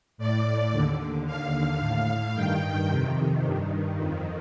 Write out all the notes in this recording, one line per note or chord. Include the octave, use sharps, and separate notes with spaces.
A2 D5
D#2 D3
D#2 D3 F5
A2 F5
G2 D#3 G5
F2 C3 D#3
G2 D#3
F2 D#3